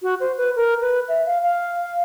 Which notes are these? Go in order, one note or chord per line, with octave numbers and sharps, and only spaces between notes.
F#4
C5
B4
A#4
B4
E5
F5
F5